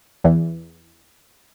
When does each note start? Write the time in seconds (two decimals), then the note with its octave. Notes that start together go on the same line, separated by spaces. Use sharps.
0.24 E2 E3